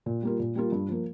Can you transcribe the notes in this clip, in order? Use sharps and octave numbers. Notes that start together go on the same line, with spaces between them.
A#2
G3 A#3 F4
A#2
G3 A#3 F4
G2
F3 A#3